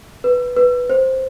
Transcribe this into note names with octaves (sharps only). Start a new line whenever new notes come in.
B4
B4
C5